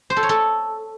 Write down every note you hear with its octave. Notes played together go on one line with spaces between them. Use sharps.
C5
A4
C#5
A4